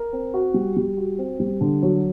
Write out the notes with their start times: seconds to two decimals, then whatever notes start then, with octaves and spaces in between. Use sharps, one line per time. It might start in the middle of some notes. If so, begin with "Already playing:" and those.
Already playing: A#4
0.12 C4
0.34 F#4
0.54 G3
0.76 G3
0.97 F#4
1.18 C4
1.39 G3
1.61 D3
1.82 F#3